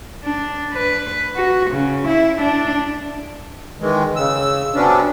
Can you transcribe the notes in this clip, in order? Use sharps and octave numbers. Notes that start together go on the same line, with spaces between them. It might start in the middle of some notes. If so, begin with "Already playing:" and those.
D4
B4
F#4
C#3
E4
D4
D#3 E3 G#3
C#3 E6
C3 F#3 B3 C#4 D4